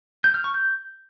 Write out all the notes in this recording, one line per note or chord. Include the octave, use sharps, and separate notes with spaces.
G6
F6
C#6
G6